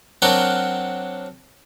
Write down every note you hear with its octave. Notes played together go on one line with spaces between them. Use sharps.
F#3 C4 D4 F#4 A#4 F5